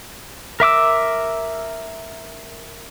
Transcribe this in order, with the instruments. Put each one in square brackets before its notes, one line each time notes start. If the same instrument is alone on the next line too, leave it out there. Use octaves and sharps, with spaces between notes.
[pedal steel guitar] A#4 E5 D6 E6